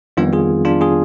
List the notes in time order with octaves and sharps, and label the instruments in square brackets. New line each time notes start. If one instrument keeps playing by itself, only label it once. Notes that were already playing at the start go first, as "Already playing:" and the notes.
[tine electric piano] F2 D#3 G3 B3 D4 F4
F4 G#4
D4 F4
F4 G#4